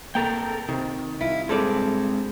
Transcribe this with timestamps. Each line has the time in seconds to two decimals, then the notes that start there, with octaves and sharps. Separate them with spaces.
0.15 C2 A#3 A4 A#4 G5
0.69 C3 D#3
1.21 C2 E4 F4
1.49 G2 G#3 C4 A4 D5